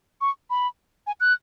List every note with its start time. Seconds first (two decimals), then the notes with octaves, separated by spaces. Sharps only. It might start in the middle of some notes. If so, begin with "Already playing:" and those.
0.21 C#6
0.50 B5
1.07 G#5
1.20 F#6